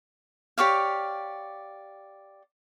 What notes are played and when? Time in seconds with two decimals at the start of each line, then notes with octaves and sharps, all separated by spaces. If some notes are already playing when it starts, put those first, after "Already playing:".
0.58 G4 C#5 D5 F5